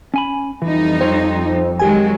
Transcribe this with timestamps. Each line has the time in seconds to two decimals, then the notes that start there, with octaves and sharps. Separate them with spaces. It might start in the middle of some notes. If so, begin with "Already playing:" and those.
0.14 C#4 G#5 B5
0.62 F2 E3 G3 D#4
1.01 C4 C5 C#5 F5
1.79 D#3 F#3 G#3 G4 G#5